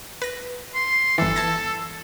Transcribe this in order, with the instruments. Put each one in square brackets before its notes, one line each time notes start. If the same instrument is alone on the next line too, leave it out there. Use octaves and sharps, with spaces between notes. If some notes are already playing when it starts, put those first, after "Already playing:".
[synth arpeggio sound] B4 A#6
[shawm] C6
[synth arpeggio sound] G1 E3 [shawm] A4
[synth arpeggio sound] A5 G#6 A#6